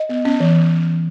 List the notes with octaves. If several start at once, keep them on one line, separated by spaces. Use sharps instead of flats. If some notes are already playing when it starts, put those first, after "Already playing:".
Already playing: D#5
B3
C#4
E3